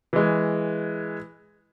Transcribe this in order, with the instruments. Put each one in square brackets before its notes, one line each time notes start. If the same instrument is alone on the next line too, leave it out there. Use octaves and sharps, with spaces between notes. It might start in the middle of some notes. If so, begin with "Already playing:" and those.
[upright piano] E3 G#3